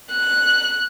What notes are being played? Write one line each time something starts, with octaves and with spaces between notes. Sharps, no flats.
F#6